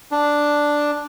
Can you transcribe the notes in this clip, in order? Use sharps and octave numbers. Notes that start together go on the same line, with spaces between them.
D4